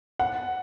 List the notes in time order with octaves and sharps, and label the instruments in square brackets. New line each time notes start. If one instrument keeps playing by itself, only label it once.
[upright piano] F#5